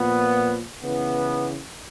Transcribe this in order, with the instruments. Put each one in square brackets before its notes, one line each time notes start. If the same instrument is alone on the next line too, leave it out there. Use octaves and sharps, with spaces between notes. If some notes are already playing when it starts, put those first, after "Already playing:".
Already playing: [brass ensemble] A#2 F3 B3
C#3 E3 B3